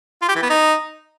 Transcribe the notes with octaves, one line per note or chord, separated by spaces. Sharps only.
F4
G4
E3
B3
D#4